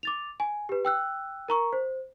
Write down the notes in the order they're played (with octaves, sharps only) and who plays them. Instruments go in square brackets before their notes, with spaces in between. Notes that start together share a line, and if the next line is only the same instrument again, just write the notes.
[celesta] D6 A6 F7
G#5
G4 B4
G5 E6 F#6
A#4 A#5 C#6
C5